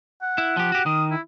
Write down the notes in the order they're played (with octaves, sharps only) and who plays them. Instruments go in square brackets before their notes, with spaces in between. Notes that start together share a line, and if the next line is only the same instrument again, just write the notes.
[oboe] F#5
[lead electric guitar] E4
F3 G4
F#4 G4
[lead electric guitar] D#3 [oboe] D#6
[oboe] E4